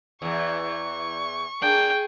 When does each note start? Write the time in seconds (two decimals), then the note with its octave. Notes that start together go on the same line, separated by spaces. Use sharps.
0.22 E2 E3 C#6
1.62 A#3 D4 G#4 G5